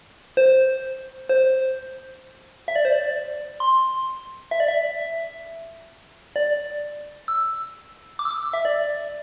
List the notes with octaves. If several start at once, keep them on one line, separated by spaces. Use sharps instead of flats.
C5
C5
E5
D5
C5
D5
C6
E5
D5
E5
D5
E6
D6
E6
D6
E6
E5
D5